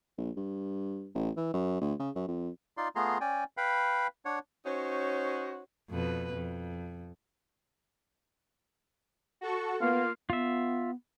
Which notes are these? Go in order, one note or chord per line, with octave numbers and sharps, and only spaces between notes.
A#1
G2
A1
E3
F#2
D2
C#3
F#2
F2
D#4 F4 D5 C6
A3 B3 F4 G#4 A#5 C6
C#4 D5 G5 G#5
B4 F5 G5 B5
D4 C#5 F#5
C#4 D#4 F#4 C5 C#5
F2 B2 B4
F2
F#4 A4 C#6
A#3 B3 F4 F5
B3 F4 E5